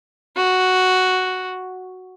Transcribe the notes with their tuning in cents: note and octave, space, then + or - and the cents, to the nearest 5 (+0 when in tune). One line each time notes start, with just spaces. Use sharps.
F#4 +0